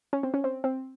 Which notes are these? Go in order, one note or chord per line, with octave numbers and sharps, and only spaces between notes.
C#4
C4
C#4
C4
C4